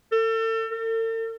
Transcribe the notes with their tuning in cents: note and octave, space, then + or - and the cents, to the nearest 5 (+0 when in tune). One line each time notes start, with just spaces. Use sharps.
A4 +35
A4 +45